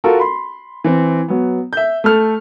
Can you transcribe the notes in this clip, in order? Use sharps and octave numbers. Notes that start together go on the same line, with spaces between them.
F4 F#4 A4 A#4
B5 C6
E3 C4
F#3 B3
E5 G6
A3 A4 F6